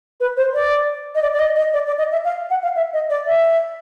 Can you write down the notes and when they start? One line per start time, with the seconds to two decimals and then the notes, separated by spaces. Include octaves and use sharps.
0.20 B4
0.37 C5
0.54 D5
1.15 D#5
1.22 D5
1.33 D5
1.39 D#5
1.56 D#5
1.74 D5
1.87 D5
1.98 D#5
2.12 E5
2.25 F5
2.50 F#5
2.63 F5
2.76 E5
2.93 D#5
3.10 D5
3.26 E5